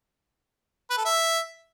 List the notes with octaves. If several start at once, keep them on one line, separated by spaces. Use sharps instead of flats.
B4
A4
E5